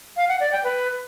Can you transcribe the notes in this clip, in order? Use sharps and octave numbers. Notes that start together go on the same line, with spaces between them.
F5
F#5
D5
G5
B4